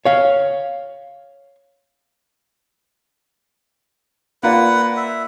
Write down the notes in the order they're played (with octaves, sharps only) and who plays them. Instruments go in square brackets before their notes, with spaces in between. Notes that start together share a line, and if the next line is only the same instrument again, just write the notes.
[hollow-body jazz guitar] C#5 F5
[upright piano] A#3 F4 D5 [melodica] B4 F#5
[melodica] E5